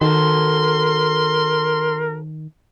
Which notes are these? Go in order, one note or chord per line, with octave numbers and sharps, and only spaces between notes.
D#3 F#4 A4 A#4 C5 C6